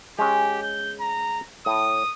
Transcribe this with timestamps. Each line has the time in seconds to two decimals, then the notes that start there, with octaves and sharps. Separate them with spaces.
0.19 G#3 C#4 G4
0.62 G6
1.00 A#5
1.66 A2 D#6